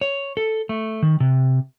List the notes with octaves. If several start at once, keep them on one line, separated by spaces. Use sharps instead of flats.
C#5
A4
A3
D#3
C3